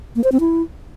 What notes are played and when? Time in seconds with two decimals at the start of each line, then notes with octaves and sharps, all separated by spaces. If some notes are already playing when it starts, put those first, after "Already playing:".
0.16 A#3
0.24 C5
0.32 C4
0.40 E4